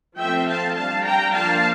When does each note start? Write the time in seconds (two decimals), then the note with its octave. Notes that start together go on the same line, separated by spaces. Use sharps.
0.18 F3 A3 C4 E5 G5
0.47 F5 A5
0.76 G3 D4 F5 A5
1.04 G5 A#5
1.33 F3 A#3 D4 F5 A5